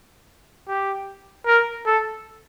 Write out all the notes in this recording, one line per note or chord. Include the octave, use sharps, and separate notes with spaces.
G4
A#4
A4